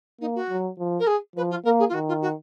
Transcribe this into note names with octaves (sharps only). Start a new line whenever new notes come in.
A#3 D#4
F#4
F#3
F3
A#4
G#4
F3 B4
F4
A#3 A#4
G#4
F4
D#3 F#4
F4
F#4